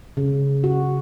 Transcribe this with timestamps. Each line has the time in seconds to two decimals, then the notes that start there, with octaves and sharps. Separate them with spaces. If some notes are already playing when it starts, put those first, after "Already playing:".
0.17 C#3
0.64 F#4